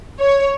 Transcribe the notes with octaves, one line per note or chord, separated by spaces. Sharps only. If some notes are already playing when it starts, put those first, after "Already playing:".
C#5